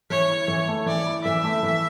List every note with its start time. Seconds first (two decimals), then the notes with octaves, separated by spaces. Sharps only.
0.10 E3 C#5
0.29 E4
0.48 E3
0.68 A3
0.86 E3 D5
1.06 E4
1.24 E3 E5
1.44 A3
1.63 E3